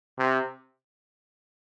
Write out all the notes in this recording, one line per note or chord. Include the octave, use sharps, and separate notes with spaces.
C3